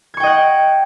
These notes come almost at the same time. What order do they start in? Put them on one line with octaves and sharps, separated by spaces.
G#6 C#6 G5 D#5 F#5